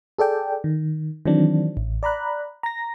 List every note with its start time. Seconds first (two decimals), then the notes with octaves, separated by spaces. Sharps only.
0.18 G#4 A4 D5 G5
0.64 D#3
1.26 D#3 E3 F#3 C4 D4
1.77 A1
2.03 D5 A#5 B5 F#6
2.63 A#5 A#6